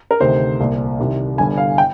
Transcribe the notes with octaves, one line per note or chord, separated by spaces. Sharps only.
A#4
D2 C3 D#3 C5
C2 A#2
C2 C3 D#3
G1 G2 D3 G#5
F5
G5